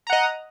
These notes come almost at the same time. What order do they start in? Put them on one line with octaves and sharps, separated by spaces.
A#5 F#5 D#5